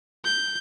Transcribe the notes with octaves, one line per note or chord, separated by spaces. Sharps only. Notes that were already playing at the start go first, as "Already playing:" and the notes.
G6